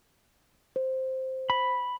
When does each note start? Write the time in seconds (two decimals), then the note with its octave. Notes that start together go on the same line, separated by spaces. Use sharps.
0.76 C5
1.50 B5